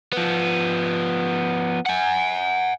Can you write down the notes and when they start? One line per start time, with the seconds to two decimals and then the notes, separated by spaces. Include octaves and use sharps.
0.13 F3 B3
1.86 F#5 G#5